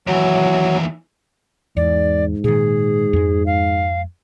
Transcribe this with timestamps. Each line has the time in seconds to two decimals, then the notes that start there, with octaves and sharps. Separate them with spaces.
0.07 D#2 E3 F#3
1.77 E2 G#2 D5
2.44 A#2 D#3 G#4
3.13 F2 G#3
3.46 F5